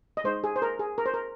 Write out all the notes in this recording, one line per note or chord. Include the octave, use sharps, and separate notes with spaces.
D#5
G#3 D#4 C5
G#4
C5
A#4
G#4
A#4
C5
A#4